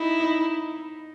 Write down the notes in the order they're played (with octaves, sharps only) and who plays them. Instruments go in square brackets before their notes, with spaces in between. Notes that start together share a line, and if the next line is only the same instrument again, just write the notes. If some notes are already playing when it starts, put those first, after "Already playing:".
Already playing: [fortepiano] D#4 [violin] E4
[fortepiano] D#4